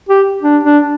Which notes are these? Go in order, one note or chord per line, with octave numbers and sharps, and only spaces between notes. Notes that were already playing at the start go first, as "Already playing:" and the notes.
G4
D4
D4